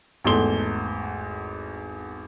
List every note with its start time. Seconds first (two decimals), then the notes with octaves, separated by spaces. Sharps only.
0.24 G#1 E2 A3 C6 G7